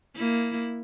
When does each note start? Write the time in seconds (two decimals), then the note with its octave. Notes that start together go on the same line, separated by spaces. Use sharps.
0.16 A#3 E4